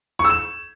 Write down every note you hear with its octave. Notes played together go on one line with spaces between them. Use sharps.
C#6
E6
E7